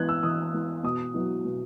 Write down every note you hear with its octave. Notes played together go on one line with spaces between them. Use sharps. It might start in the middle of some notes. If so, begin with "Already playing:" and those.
Already playing: E3 B3 E4 F#6 G#6
E6
E3 D#6
B3 E4
B2 D#6
F#3 B3 E4
B2